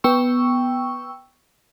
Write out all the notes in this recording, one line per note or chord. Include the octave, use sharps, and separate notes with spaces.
B3 G5 C#6 E6